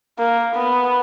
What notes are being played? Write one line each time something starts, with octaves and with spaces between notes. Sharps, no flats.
A#3
B3